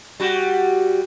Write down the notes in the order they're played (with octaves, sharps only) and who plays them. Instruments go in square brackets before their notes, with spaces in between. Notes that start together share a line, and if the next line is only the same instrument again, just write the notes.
[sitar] G3 F#4